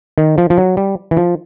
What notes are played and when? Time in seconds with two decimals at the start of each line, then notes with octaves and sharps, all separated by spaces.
0.18 D#3
0.38 F3
0.50 F3
0.58 F#3
0.77 G3
1.11 E3
1.17 F3